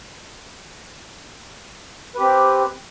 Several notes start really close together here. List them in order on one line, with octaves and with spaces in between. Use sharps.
B4 G4 C4